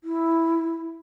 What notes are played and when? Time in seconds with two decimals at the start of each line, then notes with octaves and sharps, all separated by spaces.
0.04 E4